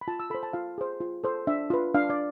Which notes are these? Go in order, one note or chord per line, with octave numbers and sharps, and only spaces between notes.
B5
F4 A5
E6
A4 C5 B5
A5
F4 F5
G#4 C5
F4
A4 C5
D4 E5
F4 B4
D4 F5
D5